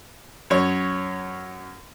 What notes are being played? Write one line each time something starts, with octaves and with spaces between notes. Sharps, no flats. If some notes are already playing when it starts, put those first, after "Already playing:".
F#2 C#5